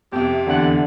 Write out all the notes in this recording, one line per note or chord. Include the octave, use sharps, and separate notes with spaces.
F2 C3 G4
E2 D3 F#5